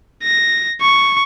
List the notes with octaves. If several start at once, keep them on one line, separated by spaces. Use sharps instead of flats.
A#6
C#6